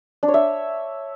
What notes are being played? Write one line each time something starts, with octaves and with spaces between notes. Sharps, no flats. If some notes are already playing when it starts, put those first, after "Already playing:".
D4
C#5
E5